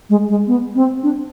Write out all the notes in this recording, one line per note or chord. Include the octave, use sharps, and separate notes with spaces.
G#3
G#3
B3
C4
D4